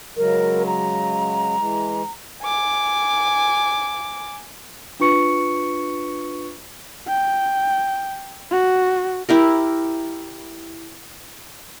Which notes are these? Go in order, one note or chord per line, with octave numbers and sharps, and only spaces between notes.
C#3 F#3 G#3 A#4
A#5
E3 G#3
G#5 D6
D4 F4 B4 C#6 C#7
G5
F#4
E4 G4 A#4